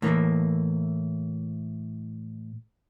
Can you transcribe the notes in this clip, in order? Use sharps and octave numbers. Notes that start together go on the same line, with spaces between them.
A2 E3 A#3